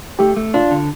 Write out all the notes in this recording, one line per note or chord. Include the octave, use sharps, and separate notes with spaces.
A3 G4
A3
D4 F4
D3